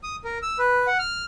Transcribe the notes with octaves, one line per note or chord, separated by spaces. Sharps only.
D#6
A#4
E6
B4
F#5
F6